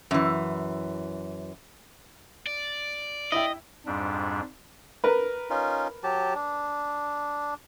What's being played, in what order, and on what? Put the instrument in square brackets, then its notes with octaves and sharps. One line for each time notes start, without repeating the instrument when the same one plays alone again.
[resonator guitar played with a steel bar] F#2 E3
[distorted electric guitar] D5
[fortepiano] E4 E5 G5 [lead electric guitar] D#5
[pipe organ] F2 G#2 G3 D4
[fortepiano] A#4 B4
[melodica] C#4 D#4 F4
F#3 G4 A5
D4